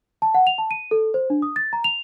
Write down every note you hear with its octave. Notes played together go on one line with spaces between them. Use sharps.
A5
F#5
F7
A5
D#7
A4
C5
D4
D#6
A6
A#5
F7